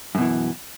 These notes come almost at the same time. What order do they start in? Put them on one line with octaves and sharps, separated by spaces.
F#2 B2 E3